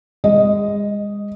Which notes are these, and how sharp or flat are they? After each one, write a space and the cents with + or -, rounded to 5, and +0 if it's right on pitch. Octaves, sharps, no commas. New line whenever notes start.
G#3 -30 D#5 +0